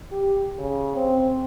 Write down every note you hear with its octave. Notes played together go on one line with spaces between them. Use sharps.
G4
C#3
C4